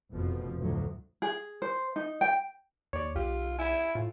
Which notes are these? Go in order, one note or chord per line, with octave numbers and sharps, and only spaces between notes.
F1 B2 F3
D2 A2 F3 F#3
G#4
C5
D#4
G5
D#2 C#5 D5
B1 F4 G4
E4 G#5 B5
A2 F4